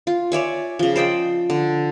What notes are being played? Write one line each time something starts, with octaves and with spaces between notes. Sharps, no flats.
F4
C#5 D5 E5 G#5
C#3 F3
C5 D5 D#5 G5
D3